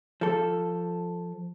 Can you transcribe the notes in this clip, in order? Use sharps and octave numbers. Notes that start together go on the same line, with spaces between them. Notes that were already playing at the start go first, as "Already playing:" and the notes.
F3 A4